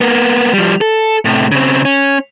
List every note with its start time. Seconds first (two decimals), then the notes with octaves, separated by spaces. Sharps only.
0.01 A#3 B3
0.53 F3 G3
0.81 A4
1.25 A2 C3
1.52 C#3 C4
1.85 C#4